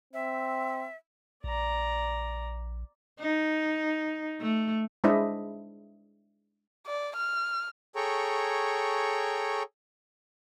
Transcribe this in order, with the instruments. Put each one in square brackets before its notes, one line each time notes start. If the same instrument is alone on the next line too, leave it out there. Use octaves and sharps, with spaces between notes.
[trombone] C4 [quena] E5
[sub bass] A#1 [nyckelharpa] D5 A#5
[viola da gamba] D#4
A3
[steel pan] G#3 D4 E4 C5 D#5 E5
[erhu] D5
F6
[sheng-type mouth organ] G#4 A4 C#5 G5 A#5 C#6